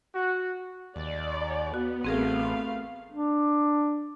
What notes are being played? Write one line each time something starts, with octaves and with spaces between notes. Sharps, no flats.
F#4
D#2 D5
B3 F#4
A1 A3 C4 G#4 A#4 F5
D4